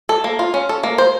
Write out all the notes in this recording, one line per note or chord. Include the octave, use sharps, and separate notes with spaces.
A4
A#3
F4
C#4
A4
A#3
C5